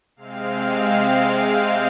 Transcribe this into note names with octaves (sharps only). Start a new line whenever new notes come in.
C3 G#3 C4 F5